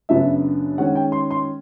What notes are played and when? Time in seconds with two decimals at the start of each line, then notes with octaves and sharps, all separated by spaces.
0.09 F#2 C#3 F#3 B3 D4 E5
0.78 D#3 G#3 C#4 F#5
0.95 G5
1.12 C6
1.31 C6